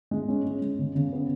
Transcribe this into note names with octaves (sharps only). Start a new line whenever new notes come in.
G#3
C#4
G#3
G#3
C#3
C#3
B3